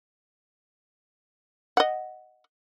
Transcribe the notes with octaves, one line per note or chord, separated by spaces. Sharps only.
D#5 F#5